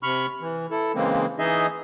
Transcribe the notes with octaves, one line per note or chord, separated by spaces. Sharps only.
C3 B5 C#6 F6
E3
E4 A4
C#3 E3 G#3 A#3 C4
E3 D#4 G#4 D#5 E5